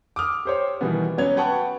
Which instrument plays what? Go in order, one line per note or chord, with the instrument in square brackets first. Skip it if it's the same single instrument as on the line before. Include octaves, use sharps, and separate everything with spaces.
[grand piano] D6 D#6 F6
G4 C5 C#5
B2 D#3 E3 G3 B3
F#3 B3 C#4 G#6 F7
B4 F#5 G5 A5 C#6